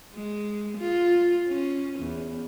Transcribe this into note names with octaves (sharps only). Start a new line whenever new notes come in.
G#3
F4
C#4
E2